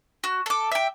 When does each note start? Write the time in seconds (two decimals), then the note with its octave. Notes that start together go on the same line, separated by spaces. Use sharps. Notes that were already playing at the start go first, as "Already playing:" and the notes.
0.24 F#4
0.46 A4 D6
0.71 E5 G5